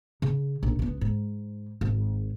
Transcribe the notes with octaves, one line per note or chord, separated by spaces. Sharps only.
C#3
A#1 D#4
C#2 B3
G#2
G#1